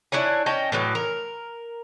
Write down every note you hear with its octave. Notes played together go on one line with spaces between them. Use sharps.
D4 E4 C#5 G#5
C#4 D#5 G5 A5
A2 E3 F#3
A#4